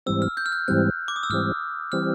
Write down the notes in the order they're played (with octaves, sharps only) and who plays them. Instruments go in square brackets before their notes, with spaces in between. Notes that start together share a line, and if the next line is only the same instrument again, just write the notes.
[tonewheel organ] G#2 E3 G3 C4 [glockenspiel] E6
[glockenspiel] F6
G6
F6
F#6
[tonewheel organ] G#2 E3 G3 C4 [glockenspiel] F#6
[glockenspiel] D6
D#6
E6
[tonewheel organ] G#2 E3 G3 C4 [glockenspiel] F6
[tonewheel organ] E3 G3 C4 [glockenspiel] F6